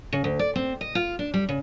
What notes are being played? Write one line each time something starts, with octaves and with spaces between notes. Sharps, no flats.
C#3
D2
D5
C4
D#5
F4
D4
G3
C#3